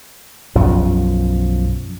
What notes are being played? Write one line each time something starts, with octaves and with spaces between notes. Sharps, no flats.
B1 F#2 F3